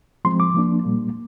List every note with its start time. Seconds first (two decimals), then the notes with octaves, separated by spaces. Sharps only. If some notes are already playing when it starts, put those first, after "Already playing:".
0.25 F3 G#3 C4 C6
0.40 D6
0.54 F3 A#3 D4
0.84 A#2 G3 A#3